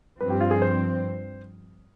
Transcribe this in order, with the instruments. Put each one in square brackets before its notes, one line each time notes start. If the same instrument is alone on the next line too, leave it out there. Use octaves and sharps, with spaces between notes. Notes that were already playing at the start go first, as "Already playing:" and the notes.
[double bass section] G2 F3 C4 [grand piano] B4
[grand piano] G4
F4
G#4
C5